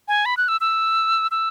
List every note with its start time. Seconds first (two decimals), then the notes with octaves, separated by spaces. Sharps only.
0.08 G#5
0.26 B5
0.37 F#6
0.48 E6
0.61 E6
1.31 E6